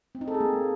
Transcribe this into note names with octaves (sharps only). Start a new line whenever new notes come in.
C4
D#4
A4
G#4
A#3